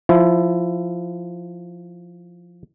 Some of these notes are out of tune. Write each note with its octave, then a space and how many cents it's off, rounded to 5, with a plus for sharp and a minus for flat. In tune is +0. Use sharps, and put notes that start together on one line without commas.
F3 +0 E4 +15